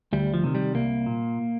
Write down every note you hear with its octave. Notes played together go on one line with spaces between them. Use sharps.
D2 G3
F3
C3 D#3
G3
C2 A#3
A#2